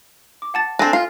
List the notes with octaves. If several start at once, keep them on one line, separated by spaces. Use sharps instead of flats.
D6
F#5 A5 A6
C4 D4 A4 G#5 A#6
F4 F6 C7